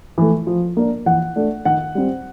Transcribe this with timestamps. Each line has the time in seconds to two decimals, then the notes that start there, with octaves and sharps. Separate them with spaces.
0.18 E3 A3
0.47 F3
0.77 A#3 D4
1.06 E3 F#5
1.36 A3 D4
1.65 D#3 F#5
1.95 G3 C4